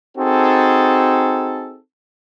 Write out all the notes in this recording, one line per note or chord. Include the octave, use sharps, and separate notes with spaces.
C4 D#4 F#4 G#4 A4